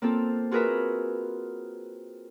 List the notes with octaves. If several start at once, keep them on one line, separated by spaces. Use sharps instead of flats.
A#3 C4 F4 A4
F4 F#4 G#4 A#4 B4 E5